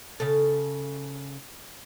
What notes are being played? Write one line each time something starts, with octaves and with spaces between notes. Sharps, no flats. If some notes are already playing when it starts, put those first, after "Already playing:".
C#3 A4